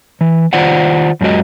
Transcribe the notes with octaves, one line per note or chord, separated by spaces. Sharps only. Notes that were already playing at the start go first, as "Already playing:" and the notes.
E3
D#3 F4 C5 D5 F#5
F#2 F#3 G#3 F#4 D#5